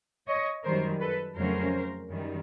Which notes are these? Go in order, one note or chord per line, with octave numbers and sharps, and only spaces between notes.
C#5 D#5
F#2 D#3 G3 A#4 C5
A4 B4
F2 C#3 F#3 A3 C#4 A#4 C5
F#2 D#3 G3